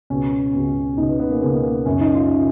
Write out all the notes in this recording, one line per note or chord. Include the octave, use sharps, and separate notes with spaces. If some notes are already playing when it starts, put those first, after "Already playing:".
C#2 B2 C#4
C#2 B2
C#2 B2 D#4
B3
B3
A#3
C#2 B2 A#3
A#3
F#2 C#3 C#4
D#4
F4
C#3